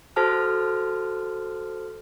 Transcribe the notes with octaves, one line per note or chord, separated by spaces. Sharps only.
F#4 A4 C5 A5 F6